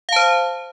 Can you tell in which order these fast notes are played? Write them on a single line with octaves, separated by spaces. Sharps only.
F5 A5 C5